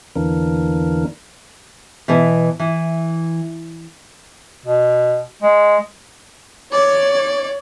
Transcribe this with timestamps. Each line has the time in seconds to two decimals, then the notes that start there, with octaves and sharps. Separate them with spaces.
0.16 E2 D3 E3 A#3 D4 A#4
2.08 B2 E3 B4
2.59 E3
4.65 B2
5.42 G#3
6.72 C#5 D5